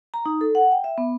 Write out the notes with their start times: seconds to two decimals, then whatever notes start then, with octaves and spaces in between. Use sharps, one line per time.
0.14 A#5
0.26 D#4
0.41 A4
0.55 F#5
0.72 G5
0.84 E5
0.98 B3